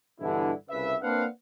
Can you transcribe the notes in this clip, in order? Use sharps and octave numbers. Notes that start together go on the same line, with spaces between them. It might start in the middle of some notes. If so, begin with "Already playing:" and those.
G2 B2 D3 E3 E4
C2 C#3 B4 E5
A#3 C4 D4 B4 F5 F#5